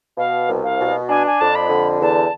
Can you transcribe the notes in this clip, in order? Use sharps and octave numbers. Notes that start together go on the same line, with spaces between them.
B2 F5
C2
F5
B2
D4 G#5
G#5
F2 A5
B5
D3
E2 A5